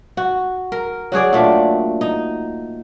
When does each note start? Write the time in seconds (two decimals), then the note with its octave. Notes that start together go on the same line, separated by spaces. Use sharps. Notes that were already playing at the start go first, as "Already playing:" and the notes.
0.17 F#4
0.72 A#4
1.12 F#3 F#4 G#4 D5
1.33 A#2 A3 D4
2.01 D#4